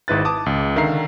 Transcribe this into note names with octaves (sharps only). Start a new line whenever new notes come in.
G#1 G#2 E4 B4 F#6 A6
A5 D6 D#6
C#2
D3 D#3 E5 F5 A#5 C7